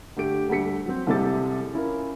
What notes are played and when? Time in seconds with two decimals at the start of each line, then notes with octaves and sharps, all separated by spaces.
0.16 D3 A3 G4 D7
0.49 D2 G3 A4 B6 C#7
0.86 F#3 C4
1.07 C2 C3 G#3 A4 D6 A6
1.73 C#4 E4 F4 A#4